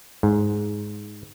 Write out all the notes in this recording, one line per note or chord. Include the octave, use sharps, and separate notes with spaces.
G#2